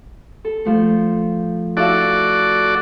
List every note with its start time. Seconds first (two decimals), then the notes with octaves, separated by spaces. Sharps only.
0.45 A4
0.65 F3 A3
1.77 E4 F#4 A4 D5 F5 E6